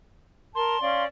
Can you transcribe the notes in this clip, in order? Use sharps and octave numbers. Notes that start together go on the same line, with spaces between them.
A#4 A5 C6
C#4 D5 F5